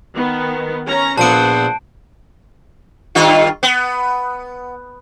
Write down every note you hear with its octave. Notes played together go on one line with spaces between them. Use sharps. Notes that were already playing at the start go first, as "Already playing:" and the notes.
D#3 B3
C#4 A#5
A#1 B3 C5 F#5 A5 D7
G2 D#3 F4
B3